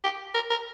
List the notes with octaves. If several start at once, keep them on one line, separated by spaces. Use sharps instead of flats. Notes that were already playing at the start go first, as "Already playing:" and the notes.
G4
A#4
A#4